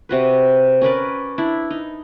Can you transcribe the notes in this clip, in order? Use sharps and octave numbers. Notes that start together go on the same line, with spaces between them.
C3 F#4 B4
C#4 A#4 B4 D5
D4 E4
D#4